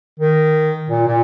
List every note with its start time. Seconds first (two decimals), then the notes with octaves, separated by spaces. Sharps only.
0.19 D#3
0.90 A#2
1.07 A#2